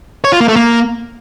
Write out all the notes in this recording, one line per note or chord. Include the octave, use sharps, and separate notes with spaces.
C#5
F4
A#3
A3
A#3